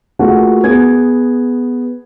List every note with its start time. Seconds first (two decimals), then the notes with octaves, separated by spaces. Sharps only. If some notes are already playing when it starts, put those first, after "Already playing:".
0.19 A3 A#3 F4 F#4 G#4 F#5
0.63 B3 G#4 G#6